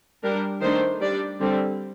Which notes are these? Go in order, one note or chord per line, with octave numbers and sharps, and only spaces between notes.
G3 D4 A#4
D#3 A3 D4 C5
G3 D4 D5
D3 G3 C4